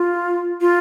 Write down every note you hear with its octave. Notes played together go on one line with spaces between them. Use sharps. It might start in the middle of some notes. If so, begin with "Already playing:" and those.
Already playing: F4
F4